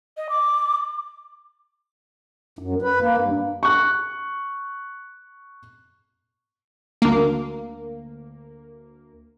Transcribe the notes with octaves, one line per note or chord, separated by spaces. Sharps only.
D#5
D6
F#2
B4
A#3
G2
C#6 F#6
D2 A#3